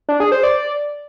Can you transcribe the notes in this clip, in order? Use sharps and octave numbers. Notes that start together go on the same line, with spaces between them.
D4
G#4
C5
D5